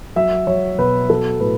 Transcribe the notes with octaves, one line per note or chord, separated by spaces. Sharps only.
F#3 E5
F#3 C#5
B2 B4
F#3 A4
A2 B4